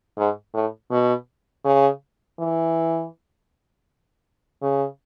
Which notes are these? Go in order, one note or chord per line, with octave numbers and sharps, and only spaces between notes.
G#2
A2
B2
C#3
E3
C#3